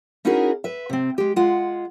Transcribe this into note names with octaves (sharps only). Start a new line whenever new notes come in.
C#4 D#4 E4 F#4 G#4 A#4
B4 E5
C3 C4
G#3 G4
G#3 F4 F#5